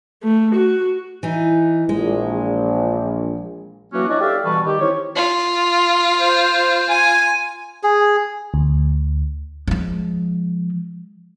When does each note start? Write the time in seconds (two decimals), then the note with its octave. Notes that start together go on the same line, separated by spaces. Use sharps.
0.23 A3
0.54 F#4
1.23 E3 D#4
1.89 A#1 G#3
3.93 E3 F#3 A#3 C#4 D4 F#4
4.09 C#4 D4 E4 F#4 D5 D#5
4.21 G4 A4 D5 E5 F5
4.45 B2 E3 G3 B4 A5 C#6
4.65 D#3 G4
4.80 C4 D#4 E4 C#5
5.16 F4
6.20 C5
6.89 G#5
7.83 G#4
8.54 D2
9.68 F3 G#3